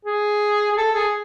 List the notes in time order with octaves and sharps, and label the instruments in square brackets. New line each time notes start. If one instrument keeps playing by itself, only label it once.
[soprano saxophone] G#4
G#4
A4
G#4